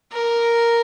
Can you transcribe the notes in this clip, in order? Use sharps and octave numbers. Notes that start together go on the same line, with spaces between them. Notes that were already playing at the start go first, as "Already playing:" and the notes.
A#4